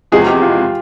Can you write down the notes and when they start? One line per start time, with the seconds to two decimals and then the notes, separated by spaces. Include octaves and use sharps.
0.12 E2 C3 F3 G#3 E4 G#4
0.27 G4
0.42 F4